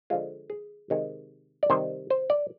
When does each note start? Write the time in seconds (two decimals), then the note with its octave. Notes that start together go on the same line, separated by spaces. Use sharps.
0.10 D3 F3 G#3 F4
0.50 G#4
0.90 C3 D#3 G#3
1.63 D5
1.70 C3 D#3 G3 C5
2.10 C5
2.30 D5